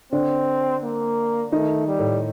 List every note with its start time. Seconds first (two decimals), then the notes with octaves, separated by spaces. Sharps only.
0.12 D3 C4 D4
0.83 A#3
1.52 D#3 A3 D#4
1.87 G3
1.99 A2 A3